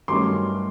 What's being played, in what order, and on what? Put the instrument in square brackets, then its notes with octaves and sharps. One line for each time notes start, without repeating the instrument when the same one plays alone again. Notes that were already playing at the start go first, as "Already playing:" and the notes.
[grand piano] G2 D#3 F#3 A3 C#4 C6 D6